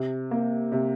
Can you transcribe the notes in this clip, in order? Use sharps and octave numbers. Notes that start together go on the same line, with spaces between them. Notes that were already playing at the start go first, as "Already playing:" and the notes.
Already playing: C3
A#3
C3